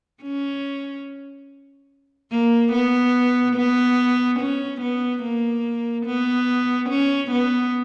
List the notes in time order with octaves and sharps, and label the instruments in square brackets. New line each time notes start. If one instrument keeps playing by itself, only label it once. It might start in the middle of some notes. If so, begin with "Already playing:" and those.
[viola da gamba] C#4
A#3
B3
B3
C#4
B3
A#3
B3
C#4
B3